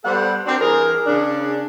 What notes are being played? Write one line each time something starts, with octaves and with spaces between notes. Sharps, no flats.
G3 B3 A4 C5 F#5
C4 D4 F#4 A#4 C5
E3 G#4 A#4
C#3 D4